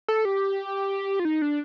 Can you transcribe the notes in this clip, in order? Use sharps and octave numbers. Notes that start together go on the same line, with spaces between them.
A4
G4
F4
D#4
D4